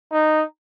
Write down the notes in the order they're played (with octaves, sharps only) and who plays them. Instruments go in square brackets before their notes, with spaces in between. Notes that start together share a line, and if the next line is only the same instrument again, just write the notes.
[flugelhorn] D#4